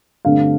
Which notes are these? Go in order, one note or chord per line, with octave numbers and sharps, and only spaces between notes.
G2 D3 A3 C4 F5